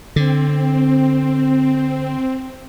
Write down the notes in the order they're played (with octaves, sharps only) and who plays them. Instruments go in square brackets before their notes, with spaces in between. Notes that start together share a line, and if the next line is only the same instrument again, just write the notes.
[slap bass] D3 [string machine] C4